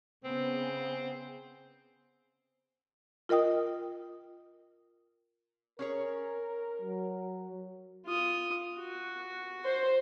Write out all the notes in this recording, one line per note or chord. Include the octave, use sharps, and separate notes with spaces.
C#3 B3 C4 G#4
F4 A#4 D#5 G5 D#6
C#4 G#4 A#4 C#5
F#3
F4 D#6
F#4
C5